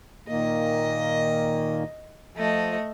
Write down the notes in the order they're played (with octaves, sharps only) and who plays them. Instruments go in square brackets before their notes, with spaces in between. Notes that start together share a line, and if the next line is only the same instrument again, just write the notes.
[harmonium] A#2 D#3 A#3 [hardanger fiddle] D#5
[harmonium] F3 [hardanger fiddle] A3 D#5